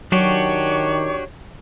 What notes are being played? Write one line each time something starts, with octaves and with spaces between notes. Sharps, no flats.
D#3 F#3 D4 F#4 G4 C#5